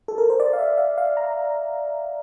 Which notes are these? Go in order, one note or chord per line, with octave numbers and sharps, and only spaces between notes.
A4
A#4
C5
D5
F5
E5
F5
F5
A#5